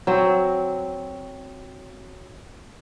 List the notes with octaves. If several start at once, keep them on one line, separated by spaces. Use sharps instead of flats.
F#3 C4